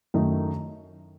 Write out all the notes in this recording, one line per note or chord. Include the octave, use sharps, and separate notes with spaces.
F#2 D#3 A3 D#4